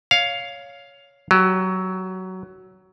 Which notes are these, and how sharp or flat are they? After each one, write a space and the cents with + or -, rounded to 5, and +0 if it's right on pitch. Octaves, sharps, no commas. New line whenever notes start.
C#5 +15 F5 +0
F#3 +15 G4 -5